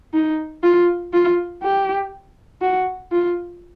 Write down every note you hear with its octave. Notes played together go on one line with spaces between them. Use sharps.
D#4
F4
F4
G4
F#4
F4